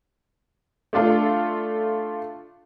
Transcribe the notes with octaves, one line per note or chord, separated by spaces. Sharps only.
A3 D4 F4 A4